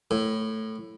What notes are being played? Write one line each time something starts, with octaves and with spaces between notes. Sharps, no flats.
A2